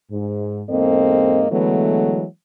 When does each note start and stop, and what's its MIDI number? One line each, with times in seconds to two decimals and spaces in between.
0.10 0.61 44
0.69 1.45 40
0.69 1.45 44
0.69 1.45 58
0.69 1.45 60
0.69 1.45 69
0.69 1.45 75
1.50 2.24 50
1.50 2.24 52
1.50 2.24 54
1.50 2.24 56
1.50 2.24 57
1.50 2.24 59